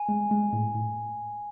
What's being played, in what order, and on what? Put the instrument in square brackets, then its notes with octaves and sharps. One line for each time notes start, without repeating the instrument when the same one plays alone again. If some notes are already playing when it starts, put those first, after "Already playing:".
Already playing: [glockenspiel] G#5
[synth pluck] G#3
G#3
A2
A2